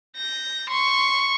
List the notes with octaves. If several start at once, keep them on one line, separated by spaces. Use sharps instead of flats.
G6 A#6
C6 C#6